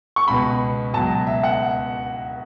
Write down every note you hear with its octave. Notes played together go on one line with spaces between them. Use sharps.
C#6
C#2 B2 B3 B5
C#2 B2 F#3 A5
E5
F#5